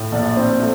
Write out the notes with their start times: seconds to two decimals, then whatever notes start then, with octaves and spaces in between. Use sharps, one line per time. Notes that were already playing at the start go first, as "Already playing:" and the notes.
Already playing: A2
0.12 A#1 D5
0.37 C4 C5
0.60 A3